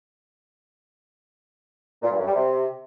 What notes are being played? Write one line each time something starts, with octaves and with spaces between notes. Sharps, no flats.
A#2
G2
F#2
G3
C3